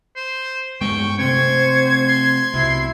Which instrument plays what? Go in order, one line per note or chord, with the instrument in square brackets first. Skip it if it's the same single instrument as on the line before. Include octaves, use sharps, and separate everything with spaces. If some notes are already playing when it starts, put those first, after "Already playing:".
[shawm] C5
[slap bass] G2 G#3 B3 [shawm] G5 [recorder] C#6
[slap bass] C3 A3 C4 [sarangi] C5 [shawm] C#6 [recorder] G#6
[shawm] C6
[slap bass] C2 B2 [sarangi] E4